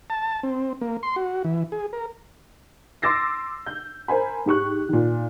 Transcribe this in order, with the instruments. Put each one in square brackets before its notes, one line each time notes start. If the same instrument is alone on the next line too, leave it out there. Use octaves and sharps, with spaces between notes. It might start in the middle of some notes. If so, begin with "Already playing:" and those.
[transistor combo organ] A5
C4
A#3
C6
F#4
E3
G#4
A#4
[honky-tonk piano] C6 D6 E6 A6 A#6 C7
G6
A#4 C5 G#5 B5
G#2 G4 C#6 F#6
A#2 D#3